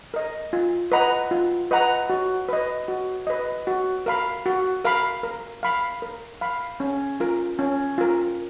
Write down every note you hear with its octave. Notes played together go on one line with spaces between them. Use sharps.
A#4 D#5
F4
B4 D#5 F#5 A#5
F4
B4 D#5 F#5 A#5
F#4
B4 D#5
F#4
B4 D#5
F#4
A#4 F5 B5
F#4
A#4 F5 B5
A#4
F5 B5
A#4
F5 B5
C#4
F4 A#4
C#4
F4 A#4